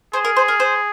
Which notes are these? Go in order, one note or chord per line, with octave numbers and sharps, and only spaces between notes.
G#4 C5
A#4
C5
A#4
C5